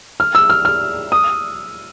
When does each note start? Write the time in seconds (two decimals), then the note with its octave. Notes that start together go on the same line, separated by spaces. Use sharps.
0.20 F6
0.35 E6
0.50 F6
0.65 F6
1.12 D#6